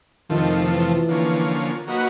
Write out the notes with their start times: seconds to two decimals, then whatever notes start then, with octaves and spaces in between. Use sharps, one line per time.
0.30 F2 C3 D#3 F3 A3
0.69 E3
1.08 D3 F3 A#3 C#4
1.87 F#3 A#3 D#4 F#4 B4